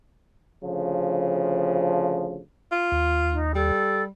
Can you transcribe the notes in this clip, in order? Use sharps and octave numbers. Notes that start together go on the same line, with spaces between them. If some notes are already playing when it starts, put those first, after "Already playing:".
D2 C#3 F3
F4
D#2
D#4
G3 A4